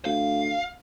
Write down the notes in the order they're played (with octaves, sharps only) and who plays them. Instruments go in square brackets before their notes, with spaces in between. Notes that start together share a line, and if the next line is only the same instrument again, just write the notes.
[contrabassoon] D2 [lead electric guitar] F5